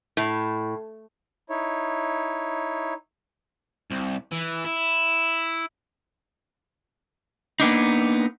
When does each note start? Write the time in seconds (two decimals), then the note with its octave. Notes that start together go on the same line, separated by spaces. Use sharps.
0.17 A2
1.50 D#4 E4 C#5
3.91 C2
4.32 E3
4.65 E4
7.60 A#3 B3 D4 D#4